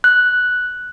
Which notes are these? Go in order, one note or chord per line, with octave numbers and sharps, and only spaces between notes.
F#6